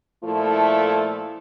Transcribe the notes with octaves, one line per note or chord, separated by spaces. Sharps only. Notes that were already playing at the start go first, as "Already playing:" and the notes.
A#2 F3 A3 E4 A4